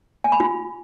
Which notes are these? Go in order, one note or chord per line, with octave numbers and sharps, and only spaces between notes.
G#5
B5
F4